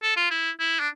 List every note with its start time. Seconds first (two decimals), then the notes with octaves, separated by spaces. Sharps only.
0.03 A4
0.16 F4
0.31 E4
0.59 E4
0.80 D4